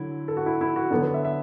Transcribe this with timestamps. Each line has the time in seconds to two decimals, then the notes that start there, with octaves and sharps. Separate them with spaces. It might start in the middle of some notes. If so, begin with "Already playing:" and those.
Already playing: D3 F#3 E4
0.28 A4
0.37 F#4
0.46 E4
0.61 E4
0.76 F#4
0.90 D3 F#3 B3 D4 A4
1.02 B4
1.14 E5
1.25 E5